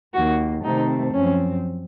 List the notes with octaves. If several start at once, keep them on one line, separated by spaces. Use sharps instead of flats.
D#2 D#3 A#3 F#4
C3 D#3 A3 C4 D#4
F#2 F3 C4 C#4